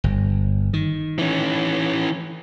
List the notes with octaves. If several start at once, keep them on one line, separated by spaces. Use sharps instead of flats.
G1
D#3
E3 C#4